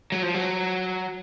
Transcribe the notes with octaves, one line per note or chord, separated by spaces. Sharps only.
F#3
F3
F#3